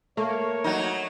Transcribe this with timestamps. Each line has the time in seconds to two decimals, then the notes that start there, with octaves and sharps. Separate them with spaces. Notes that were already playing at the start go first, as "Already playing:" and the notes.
0.17 A3 A#3 C#5
0.64 F#3 D#4